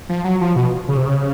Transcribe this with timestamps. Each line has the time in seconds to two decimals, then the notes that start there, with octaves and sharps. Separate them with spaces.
0.09 F3
0.24 F#3
0.41 F3
0.56 B2
0.88 C#3
0.97 C3
1.06 C#3